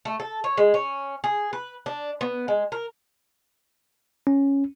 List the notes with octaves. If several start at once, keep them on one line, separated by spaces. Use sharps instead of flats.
A3
A4
C#5
G#3
C#4
G#4
B4
D4
B3
G#3
A#4
C#4